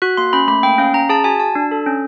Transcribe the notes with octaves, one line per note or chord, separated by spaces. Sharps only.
F#4 F#6
A#3 C6
C#4 B5
A3 B5
A#3 G5
C#4 F5
C#4 A#5
G#4 A5
F#4 G#5
F#4 A5
D4
A4
C#4